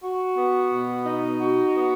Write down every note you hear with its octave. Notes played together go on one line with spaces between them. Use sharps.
F#4
B3
B2
D#4
F#4
B3